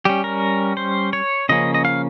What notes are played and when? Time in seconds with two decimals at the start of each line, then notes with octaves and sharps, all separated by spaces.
0.05 G3 C#4 G4
0.24 A#4
0.77 C5
1.13 C#5
1.49 C#3 F3 A#3 C#4 D#5
1.74 D#5
1.85 F5